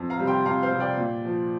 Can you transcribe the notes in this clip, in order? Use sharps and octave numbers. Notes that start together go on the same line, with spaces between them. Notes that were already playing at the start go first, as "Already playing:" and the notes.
Already playing: F2
F5 A#5
C3 G3
G5 C6
F2 F5 A#5
C5 F5
C3 G3
D5 G5
A#2
F3